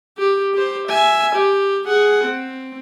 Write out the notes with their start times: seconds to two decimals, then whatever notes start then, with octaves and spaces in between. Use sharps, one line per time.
0.18 G4
0.54 G4 C5
0.88 E5 G#5
1.35 G4
1.87 G#4 F#5
2.24 C4